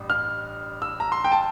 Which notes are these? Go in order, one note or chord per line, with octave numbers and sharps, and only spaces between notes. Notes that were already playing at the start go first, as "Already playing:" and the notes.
Already playing: A1 G2
F6
E6
A#5
C6
G5
A5